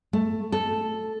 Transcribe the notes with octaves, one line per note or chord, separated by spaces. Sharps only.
A3
A4